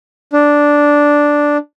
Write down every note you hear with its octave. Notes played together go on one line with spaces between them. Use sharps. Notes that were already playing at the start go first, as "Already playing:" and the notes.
D4